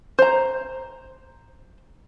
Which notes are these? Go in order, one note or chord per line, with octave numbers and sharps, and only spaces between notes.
C5 A#5